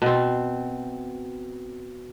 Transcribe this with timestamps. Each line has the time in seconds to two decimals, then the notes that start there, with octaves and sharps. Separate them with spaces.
0.02 B2 C4